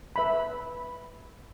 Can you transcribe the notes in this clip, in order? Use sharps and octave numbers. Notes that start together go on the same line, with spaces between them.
B4 E5 B5